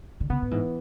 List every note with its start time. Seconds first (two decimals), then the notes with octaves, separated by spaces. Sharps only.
0.20 D3
0.30 C#3 B3
0.42 A2
0.51 G#2 E3